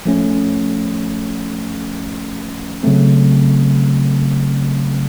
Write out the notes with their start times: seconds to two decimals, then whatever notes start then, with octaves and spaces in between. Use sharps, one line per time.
0.05 F3 A3 C#4
2.83 C#3 F#3 A3 C4